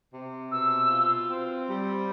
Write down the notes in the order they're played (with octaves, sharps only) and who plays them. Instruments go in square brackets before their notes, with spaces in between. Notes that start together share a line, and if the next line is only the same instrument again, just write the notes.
[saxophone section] C3
[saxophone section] B2 [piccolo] E6
[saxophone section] F4
C4
G3